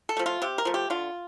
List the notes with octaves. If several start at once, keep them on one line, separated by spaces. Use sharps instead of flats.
A4
F3 A3
F4
C3 G4
A#4
F3 A3
G4
D3 F4